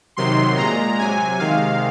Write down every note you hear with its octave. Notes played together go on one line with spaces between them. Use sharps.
C3 D#3 F#3 C6
A#2 G#3 A#5
C3 F#3 G#5
C3 D#3 G#3 F5